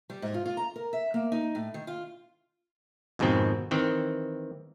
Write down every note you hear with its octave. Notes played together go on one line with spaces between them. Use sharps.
G3
G#2
F4
F4
A#5
A#4
E5
A#3
D#4
A2
D#3
F4
F2 G#2 B2 D#3 C4
D#3 E3 C4